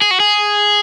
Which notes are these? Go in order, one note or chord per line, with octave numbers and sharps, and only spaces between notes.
G#4
F#4
G#4